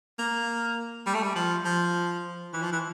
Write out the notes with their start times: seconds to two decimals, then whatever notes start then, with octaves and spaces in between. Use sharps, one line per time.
0.19 A#3
1.07 G3
1.15 A3
1.23 G3
1.36 F3
1.65 F3
2.53 E3
2.62 F3
2.72 E3